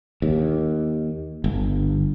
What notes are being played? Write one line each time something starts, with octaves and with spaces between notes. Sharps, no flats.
D#2
G1